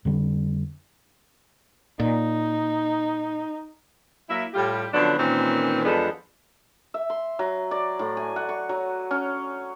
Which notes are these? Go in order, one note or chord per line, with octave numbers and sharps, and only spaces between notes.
F2 D3 G3
A#2 D#4
F#3 A#3 E4 E5
A2 G3 F4 G4
D3 F3 F#3 B3 C#4 D4
A#2 D#3 E3 C4 C#4
E2 F3 G#3 B3 D4 A4
E5
C6
F#3
D5
A2
G#5
F#5
C#6
F#3
C#4